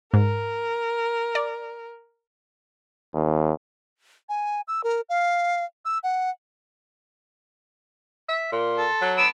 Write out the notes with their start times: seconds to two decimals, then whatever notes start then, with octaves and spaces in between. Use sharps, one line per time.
0.14 G#2 A#4
1.35 D5
3.14 D#2
4.29 G#5
4.68 E6
4.84 A#4
5.09 F5
5.85 E6
6.03 F#5
8.29 E5
8.52 A#2 C6
8.78 A4
9.01 F#3
9.18 D3 B3 E6 D7